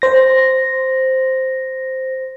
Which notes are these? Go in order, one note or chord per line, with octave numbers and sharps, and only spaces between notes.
C5 A#6